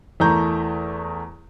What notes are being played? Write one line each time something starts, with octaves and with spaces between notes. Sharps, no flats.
E2 E3 A3 A#4 A#5 G6